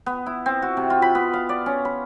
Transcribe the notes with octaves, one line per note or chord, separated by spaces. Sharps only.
B3
E4
C4
F#4
C3
F4
B5
B3
F5
D5
C#4
B5